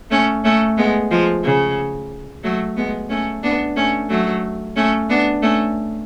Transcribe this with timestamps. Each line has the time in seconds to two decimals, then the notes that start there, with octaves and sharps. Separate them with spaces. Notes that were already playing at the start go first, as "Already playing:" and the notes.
0.10 A3 C#4
0.44 A3 C#4
0.78 G#3 B3
1.11 F3 G#3
1.44 C#3
2.43 F#3 A3
2.77 G#3 B3
3.09 A3 C#4
3.43 B3 D4
3.76 A3 C#4
4.10 F#3 A3
4.76 A3 C#4
5.09 B3 D4
5.42 A3 C#4